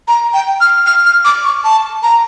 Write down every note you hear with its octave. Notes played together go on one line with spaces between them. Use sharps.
A#5
G5
F6
F6
F6
D6
C#6
A5
A#5